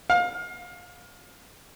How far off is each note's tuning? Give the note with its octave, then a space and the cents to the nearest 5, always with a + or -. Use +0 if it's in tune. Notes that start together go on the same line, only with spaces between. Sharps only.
F5 +30